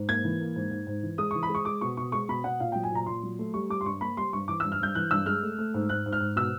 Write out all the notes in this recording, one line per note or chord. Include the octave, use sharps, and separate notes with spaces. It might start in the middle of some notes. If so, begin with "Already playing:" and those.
Already playing: G#2
A#3 G#6
E3
A#3
G#2
G#2
G#2
E3
G#3 D#6
E3 C#6
B5
G#3
C#6
G#3 D6
B2 C#6
B2 C#6
G#3 C#6
B2 B5
B2 F#5
A#2 F5
F#3 G5
G#5
A#2 A#5
A#2 C6
F#3
A3
G3 C#6
G3 D6
C6
G2 C#6
A#3 B5
G3 C6
G2 C#6
E3 D6
G2 E6
F6
G2 G6
E3 F#6
G2 E6
G#3 F6
A3
A3
G#2
G#2 F#6
G#2
F6
G#2
B2 E6